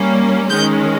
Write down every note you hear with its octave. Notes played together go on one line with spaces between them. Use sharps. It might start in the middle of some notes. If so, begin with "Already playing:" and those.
Already playing: G3 A#3 C#4
D#3 G#3 C#4 G6